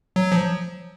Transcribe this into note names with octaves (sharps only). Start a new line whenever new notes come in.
F#3
F3